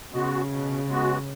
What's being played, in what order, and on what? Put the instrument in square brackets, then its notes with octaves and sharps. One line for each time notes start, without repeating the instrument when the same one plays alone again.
[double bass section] C#3 [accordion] G#3 B3 F#4
[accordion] B2
G#3 B3 F#4